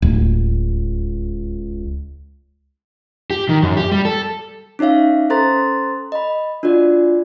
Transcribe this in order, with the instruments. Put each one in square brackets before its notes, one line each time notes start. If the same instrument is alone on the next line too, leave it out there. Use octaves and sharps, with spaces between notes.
[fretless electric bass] D1 [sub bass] C#2
[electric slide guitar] G4
D#3
F#2
G4
G3
A4
[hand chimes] C#4 D#4 C#5 E5 F5
C#4 A4 C5 A#5 C6 A6
D#5 B5
D4 F4 F#4 D5